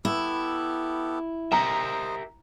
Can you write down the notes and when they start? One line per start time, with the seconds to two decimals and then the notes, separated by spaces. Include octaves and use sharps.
0.05 B3 E4 G4 A4
1.52 G4 A#4 C5 D#5 E5 A#5